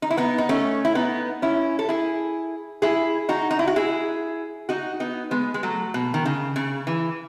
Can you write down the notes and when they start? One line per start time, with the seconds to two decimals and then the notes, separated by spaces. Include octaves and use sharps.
0.02 D#4
0.10 E4
0.17 B3 D#4
0.38 D#4
0.49 A3 C#4
0.85 E4
0.95 B3 D#4
1.42 C#4 E4
1.79 A4
1.89 E4 G#4
2.82 E4 G#4
3.29 D#4 F#4
3.51 D#4
3.59 E4
3.67 F#4
3.76 E4 G#4
4.69 D#4 F#4
5.00 B3 D#4
5.31 G#3 B3
5.54 G#3
5.63 F#3 A3
5.94 B2
6.14 D#3
6.26 C#3
6.56 C#3
6.87 E3